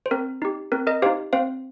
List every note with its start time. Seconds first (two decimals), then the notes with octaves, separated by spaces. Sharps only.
0.06 C5
0.11 C4 A#4
0.42 D#4 G4
0.72 C4 A#4
0.87 A#4 D#5
1.02 D#4 G4 C5 F5
1.33 C4 C5 F5